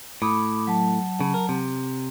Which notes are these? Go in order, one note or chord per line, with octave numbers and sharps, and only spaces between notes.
A2 B5 D6 D#6
F#3 A5
C#3
A#4
C3